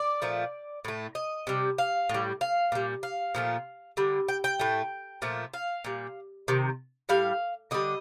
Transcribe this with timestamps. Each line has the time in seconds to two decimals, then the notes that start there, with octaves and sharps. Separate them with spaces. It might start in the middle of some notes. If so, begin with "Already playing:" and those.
Already playing: D5
0.22 A#2 F3 A3
0.85 A2 A3
1.15 D#5
1.47 C3 G3
1.78 F5
2.09 A2 G3
2.41 F5
2.72 A#2 G3
3.03 F5
3.34 A#2 F3 A3
3.97 D3 G3
4.28 G5
4.44 G5
4.59 A2 A3
5.22 A#2 F3 A3
5.54 F5
5.84 A#2 G3
6.48 C3 D#3
7.09 A2 G3 F5
7.71 D3 G3 D#5